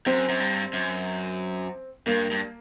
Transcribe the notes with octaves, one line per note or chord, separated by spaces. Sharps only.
F#2 C4
F#2
G2
F#2
G2 A#3
G2